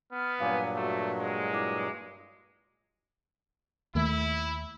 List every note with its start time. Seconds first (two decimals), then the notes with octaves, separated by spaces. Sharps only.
0.12 B3 F6
0.40 G2 A#2 F#3 F5 G#5 D6
0.76 A3 F#4
1.20 G#3
1.52 E4 D6
3.95 D#2 D#3 A3 E4